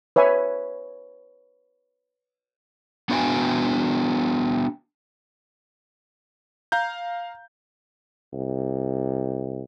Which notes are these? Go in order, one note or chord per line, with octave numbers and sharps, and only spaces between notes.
B4 C#5 E5 G#5
B3 D4 F#4 F5 G5 G#5
F5 A#5 G6
C2